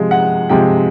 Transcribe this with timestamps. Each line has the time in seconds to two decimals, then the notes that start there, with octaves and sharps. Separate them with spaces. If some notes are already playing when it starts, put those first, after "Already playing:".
Already playing: C3 F3 G#3
0.11 F#5
0.49 C3 F3 G#3 G5